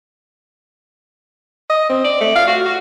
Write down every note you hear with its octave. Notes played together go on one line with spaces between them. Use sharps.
D#5
C4
D5
A3
F5
F#4
F#4